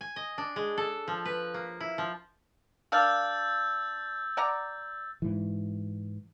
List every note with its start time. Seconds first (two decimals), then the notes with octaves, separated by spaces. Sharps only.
0.01 G#5
0.16 D#5
0.38 D4
0.56 G#3
0.77 A4
1.08 F3
1.25 B4
1.54 A#3
1.80 E4
1.98 F3
2.92 A#3 D4 F5 E6 G6 A6
4.37 D5 F#5 A#5
5.22 G#2 E3